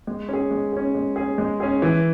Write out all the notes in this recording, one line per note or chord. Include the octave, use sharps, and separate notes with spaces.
G#3
C#4 G#4
G#3
C#4 G#4
G#3
C#4 G#4
G#3
C#4 G#4
E3